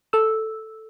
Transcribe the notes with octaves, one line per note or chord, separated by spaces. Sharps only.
A4 E6